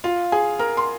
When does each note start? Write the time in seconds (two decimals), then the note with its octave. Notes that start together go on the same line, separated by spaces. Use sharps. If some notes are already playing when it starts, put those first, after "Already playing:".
0.04 F4 F5
0.32 G#4 G#5
0.59 A#4 A#5
0.77 C6